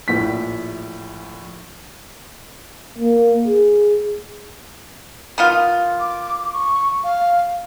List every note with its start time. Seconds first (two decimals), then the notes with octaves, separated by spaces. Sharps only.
0.08 A#1 A2 B6
2.98 A#3
3.47 G#4
5.38 D#3 B3 F4
6.00 D6
6.53 C#6
7.04 F5